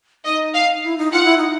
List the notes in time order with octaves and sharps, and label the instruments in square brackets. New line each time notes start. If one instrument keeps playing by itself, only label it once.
[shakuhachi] D#4 [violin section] D#5
[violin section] F5
[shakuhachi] E4
D#4
[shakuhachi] F4 [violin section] F#5
[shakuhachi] E4
D#4